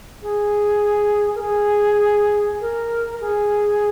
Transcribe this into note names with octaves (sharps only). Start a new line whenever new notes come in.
G#4
A#4
G#4
A#4
G#4